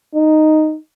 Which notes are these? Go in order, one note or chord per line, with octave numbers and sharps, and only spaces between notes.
D#4